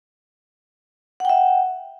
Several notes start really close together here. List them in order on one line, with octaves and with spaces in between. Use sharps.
F#5 G5 E5